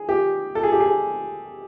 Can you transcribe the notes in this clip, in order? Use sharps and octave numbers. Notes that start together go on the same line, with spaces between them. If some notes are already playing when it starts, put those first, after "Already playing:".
Already playing: G#4
G4
A4
G#4
G4
G#4